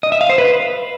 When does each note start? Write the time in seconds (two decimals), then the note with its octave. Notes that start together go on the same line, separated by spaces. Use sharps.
0.03 D#5
0.12 E5
0.21 F5
0.29 C5
0.38 B4